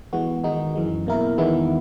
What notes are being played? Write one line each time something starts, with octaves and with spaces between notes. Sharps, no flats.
E3 G#3 B3 F#4
D#3 G#3 D#4 F#4
F#2 E3 G#3
B2 A#3 E4 A#4
E2 D#3 G#3 B3 E4